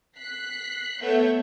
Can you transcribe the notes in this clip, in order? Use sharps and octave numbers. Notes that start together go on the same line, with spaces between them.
F#6 B6 C7
A3 B3 C#5 E5 G6